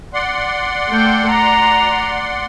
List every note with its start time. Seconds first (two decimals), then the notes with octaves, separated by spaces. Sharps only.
0.13 D5 F#5 C6
0.89 A3 G5
1.30 A#5